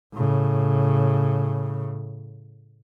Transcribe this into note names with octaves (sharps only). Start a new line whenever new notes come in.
A2 C#3